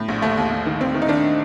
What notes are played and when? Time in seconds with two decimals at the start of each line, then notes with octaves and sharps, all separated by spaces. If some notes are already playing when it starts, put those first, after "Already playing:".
Already playing: A2
0.08 A#1
0.22 D#2 A3
0.37 D#2
0.51 D#2
0.66 D#3
0.80 D#2 C4
0.94 D#3
1.02 D#4
1.08 D#3 D4